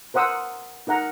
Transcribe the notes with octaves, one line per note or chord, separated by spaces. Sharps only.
A#4 C5 F#5 D#6 E6
D#4 A#4 F#5 A#5